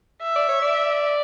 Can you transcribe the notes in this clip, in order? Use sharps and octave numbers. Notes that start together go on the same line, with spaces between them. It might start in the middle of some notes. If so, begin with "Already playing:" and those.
E5
D5
C#5
D5